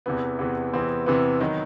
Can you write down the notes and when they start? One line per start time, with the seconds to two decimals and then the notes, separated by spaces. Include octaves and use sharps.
0.06 E2 C3 E3 B3
0.39 E2 C3 E3 B3
0.74 E2 C3 E3 B3 C4
1.06 E2 C3 E3 B3
1.40 D#3 F#3 B3 D#4